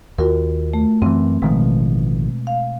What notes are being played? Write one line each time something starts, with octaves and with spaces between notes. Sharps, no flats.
D#2 F4 F#4 A#4
A3
F#2 E3 C4
A1 B2 D#3 F3 G#3
F5